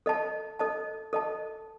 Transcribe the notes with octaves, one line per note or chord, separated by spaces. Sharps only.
A4 D#5 A5
A4 D#5 A5
A4 D#5 A5